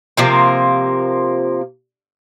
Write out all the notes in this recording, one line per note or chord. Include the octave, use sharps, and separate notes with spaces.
C3 F3 A#3